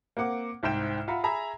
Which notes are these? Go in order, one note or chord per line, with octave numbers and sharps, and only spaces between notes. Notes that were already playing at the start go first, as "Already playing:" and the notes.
A#3 C4 F#5 D6
C2 G#2 E4 C5 G5 E7
F4 E5 F#5 A#5 B5
G#4 E5 G#5 A#5 B5